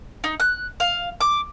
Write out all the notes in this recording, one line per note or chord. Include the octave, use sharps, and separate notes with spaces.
D#4
F#6
F5
D6